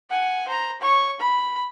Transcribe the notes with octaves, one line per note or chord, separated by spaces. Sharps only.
F#5 G#5
C5 A#5
C#5 C#6
B5